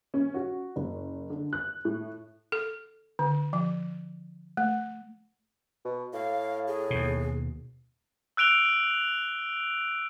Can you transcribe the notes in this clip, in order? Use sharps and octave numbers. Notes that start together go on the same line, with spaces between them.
C#4
F#4
F#1
D3
F#6
A2
A4
D3
F3
A3
B2
A2 F5
G#4
D#2 B2
E6 F#6 D7 F7 G7